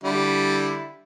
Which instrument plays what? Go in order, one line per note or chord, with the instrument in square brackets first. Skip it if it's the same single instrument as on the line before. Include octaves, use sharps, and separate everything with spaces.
[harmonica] D3 G3 E4